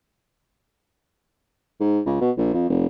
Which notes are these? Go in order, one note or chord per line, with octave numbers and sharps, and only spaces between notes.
G#2
C#2
B2
A#1
F2
F1